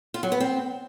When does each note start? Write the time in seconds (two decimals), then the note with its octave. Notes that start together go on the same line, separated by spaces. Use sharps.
0.14 F4
0.23 F#3
0.32 B3
0.40 C4